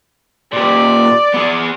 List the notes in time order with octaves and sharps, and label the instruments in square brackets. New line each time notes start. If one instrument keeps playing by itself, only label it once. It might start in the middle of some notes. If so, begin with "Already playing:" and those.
[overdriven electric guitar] A#2 G4 [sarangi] D5
[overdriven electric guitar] B3 G#4